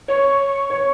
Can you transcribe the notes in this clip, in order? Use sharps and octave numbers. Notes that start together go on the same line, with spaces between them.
C#5 C#6
C#5 C#6